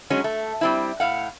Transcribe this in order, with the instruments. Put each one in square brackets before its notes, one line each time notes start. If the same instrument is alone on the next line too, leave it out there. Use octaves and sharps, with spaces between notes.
[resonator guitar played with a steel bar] F#3 G#3 C#4
A3
G3 C4 E4
A2 F5 F#5